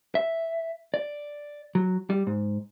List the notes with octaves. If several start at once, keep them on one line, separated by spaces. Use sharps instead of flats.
E5
D5
F#3
G3
G#2